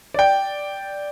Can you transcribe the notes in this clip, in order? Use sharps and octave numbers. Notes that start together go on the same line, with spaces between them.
D5 G5